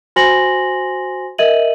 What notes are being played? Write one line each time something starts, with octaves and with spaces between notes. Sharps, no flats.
F#4 C5 G#5 C6 A#6 F#7
A#4 D#5 E5 D#7 F#7